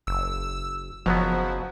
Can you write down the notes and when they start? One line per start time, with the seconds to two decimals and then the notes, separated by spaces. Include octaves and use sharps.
0.07 F#1 E6
1.06 F#1 B2 F3 F#3 B3